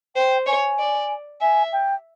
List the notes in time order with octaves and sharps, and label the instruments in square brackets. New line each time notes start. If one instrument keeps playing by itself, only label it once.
[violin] C5 [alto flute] G5
[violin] C#5 [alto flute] G#5
[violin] D5
[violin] E5 [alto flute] G#5
[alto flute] G5